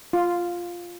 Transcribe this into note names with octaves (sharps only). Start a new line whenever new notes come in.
F4